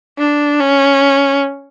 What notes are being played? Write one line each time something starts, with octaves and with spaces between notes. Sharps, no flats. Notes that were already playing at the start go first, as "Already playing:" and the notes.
D4
C#4